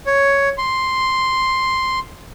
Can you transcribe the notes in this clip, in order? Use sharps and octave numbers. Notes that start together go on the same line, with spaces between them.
C#5
C6